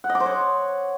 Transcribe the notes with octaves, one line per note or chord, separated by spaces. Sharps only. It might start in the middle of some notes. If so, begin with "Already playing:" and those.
F#5
D#5
D6
C5
C#5